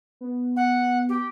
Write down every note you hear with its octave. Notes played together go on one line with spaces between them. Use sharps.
B3
F#5
G4